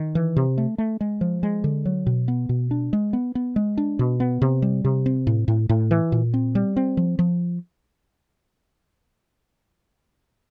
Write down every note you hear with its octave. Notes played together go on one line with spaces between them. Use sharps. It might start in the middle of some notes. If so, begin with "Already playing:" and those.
Already playing: D#3
E3
C3
A3
A3
G#3
F3
G#3
D3
F#3
B2
B3
B2
D4
G#3
B3
B3
G#3
D4
B2
B3
C3
G3
C3
C4
A2
A2
A2
E3
A#2
C4
G3
C4
F3
F3